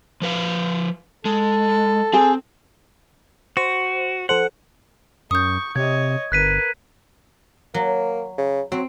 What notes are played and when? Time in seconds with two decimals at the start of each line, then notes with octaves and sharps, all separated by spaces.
0.22 F3 B4 F5
1.25 G#3 A4
2.13 C4 G#4
3.57 F#4 C5
4.29 F3 A4 C5 F#5
5.31 F#2 C#6 D#6 G6
5.76 C3 C#5 D#5 G#6
6.32 G1 A#4 B4 F#6 B6 D#7
7.74 F#3 A#3
8.38 C#3
8.72 F#3 C4